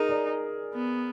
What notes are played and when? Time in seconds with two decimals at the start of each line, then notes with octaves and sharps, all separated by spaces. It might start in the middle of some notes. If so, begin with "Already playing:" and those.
Already playing: D#4 G#4 A#4
0.09 D5
0.74 B3